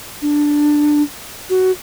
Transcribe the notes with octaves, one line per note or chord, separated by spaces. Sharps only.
D4
F#4